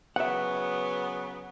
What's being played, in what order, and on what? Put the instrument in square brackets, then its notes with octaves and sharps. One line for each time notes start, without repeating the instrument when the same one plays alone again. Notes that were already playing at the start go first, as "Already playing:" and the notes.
[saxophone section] C#3 F#3 B3 [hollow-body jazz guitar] E5 F#5